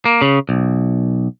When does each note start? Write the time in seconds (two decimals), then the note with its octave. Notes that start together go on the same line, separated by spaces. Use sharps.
0.05 A#3
0.21 C#3
0.49 B1